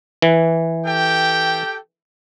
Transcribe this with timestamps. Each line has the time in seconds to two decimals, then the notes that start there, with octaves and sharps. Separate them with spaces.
0.22 E3
0.85 G4 A4 G5